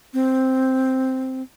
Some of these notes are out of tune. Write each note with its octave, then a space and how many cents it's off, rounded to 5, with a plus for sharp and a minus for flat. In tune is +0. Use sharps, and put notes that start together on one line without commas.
C4 +0